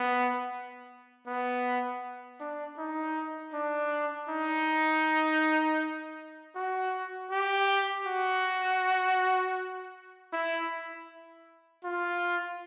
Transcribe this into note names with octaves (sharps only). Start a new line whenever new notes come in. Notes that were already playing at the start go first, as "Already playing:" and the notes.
Already playing: B3
B3
D4
D#4
D4
D#4
F#4
G4
F#4
E4
F4